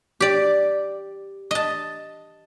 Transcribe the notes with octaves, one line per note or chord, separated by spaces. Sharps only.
G4 D5
D#5 A5